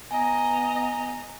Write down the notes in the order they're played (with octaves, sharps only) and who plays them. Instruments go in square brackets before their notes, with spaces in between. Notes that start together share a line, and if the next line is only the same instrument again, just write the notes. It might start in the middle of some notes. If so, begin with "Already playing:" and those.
[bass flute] B3 [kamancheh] D#5 A#5 [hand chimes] G#5